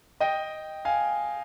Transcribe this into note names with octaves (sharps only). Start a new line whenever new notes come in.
D#5 G5
F5 G#5